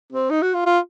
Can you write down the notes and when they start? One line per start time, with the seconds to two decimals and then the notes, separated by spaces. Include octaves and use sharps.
0.12 C4
0.30 D#4
0.42 F#4
0.54 F4
0.66 F4